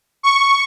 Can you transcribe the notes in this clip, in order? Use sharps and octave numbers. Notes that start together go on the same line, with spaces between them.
C#6